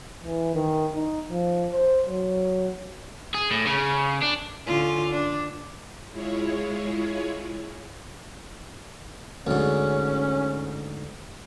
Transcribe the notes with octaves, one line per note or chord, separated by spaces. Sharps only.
E3
D#3
D#4
F3
C5
F#3
G#4
A2
C#3
D4
D3 C#4 F4
D4
G#3 E4 F4 G#4 C#5
D2 G#2 C#4